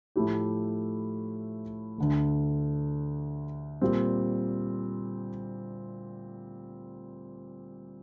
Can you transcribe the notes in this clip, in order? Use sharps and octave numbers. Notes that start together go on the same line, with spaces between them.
A2 F3 A3 E4 G4
D2 D3 A3
A#2 G3 C4